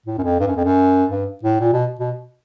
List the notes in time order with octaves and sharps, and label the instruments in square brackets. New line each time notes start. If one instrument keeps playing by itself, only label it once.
[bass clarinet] A2
F#2
F2
G2
F#2
F2
F#2
G2
A2
A#2
B2
B2